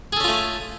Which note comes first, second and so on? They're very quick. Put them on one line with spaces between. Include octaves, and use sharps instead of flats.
G#4 A4 C#4 F4 A3